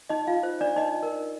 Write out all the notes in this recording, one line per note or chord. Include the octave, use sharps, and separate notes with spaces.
D#4 D#5
F4 F5
C5
D4 D5
D#4 D#5
A#4